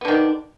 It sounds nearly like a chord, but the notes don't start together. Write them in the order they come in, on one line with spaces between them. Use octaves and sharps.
B3 D3 D#3 D4